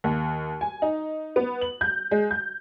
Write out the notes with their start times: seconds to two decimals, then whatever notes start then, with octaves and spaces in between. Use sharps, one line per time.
0.04 D#2
0.61 G#5
0.82 D#4
1.36 B3
1.61 F#7
1.81 G6
2.11 G#3
2.31 G6